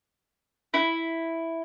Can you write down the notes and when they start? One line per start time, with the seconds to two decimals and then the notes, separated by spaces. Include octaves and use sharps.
0.74 E4